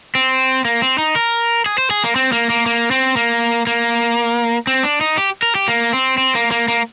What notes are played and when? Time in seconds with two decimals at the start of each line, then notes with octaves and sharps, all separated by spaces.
0.15 C4
0.65 A#3
0.82 C4
0.98 D#4
1.16 A#4
1.66 G#4
1.78 C5
1.91 G#4
2.04 A#3
2.16 C4
2.32 A#3
2.50 A#3
2.66 A#3
2.91 C4
3.17 A#3
3.67 A#3
4.67 C4
4.83 D4
5.01 D#4
5.18 G4
5.43 A#4
5.55 G4
5.68 A#3
5.93 C4
6.18 C4
6.35 A#3
6.51 A#3
6.68 A#3